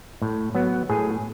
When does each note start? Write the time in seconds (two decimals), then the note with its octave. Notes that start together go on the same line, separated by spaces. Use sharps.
0.22 A2
0.55 F#3 B3
0.89 A2 G#4